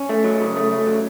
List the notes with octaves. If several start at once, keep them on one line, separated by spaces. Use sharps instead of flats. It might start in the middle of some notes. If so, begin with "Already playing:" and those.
Already playing: C#4
A3
F#3
C#3
A3
A3
F#3